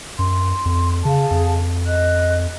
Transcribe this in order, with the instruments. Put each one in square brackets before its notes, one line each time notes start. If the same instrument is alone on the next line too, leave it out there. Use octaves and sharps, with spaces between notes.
[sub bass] F#2 [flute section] C6
[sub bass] F2
[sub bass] C#3 [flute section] G#4 F5 A5
[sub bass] F2
[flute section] D#5 F#6